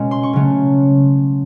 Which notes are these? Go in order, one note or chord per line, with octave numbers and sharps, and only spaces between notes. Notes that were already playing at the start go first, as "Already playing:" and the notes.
Already playing: B2 G#3 C#4
C6
C#6
C#3 F#3 A3 C#4